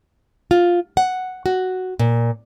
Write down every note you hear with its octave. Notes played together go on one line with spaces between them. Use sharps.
F4
F#5
F#4
A#2